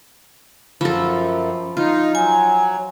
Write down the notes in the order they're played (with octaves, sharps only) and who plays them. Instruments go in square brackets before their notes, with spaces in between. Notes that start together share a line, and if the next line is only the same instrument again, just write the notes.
[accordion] F#2 [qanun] F3 A4 [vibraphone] B5
[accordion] D#4 [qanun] F4
[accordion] F#3 [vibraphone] G#5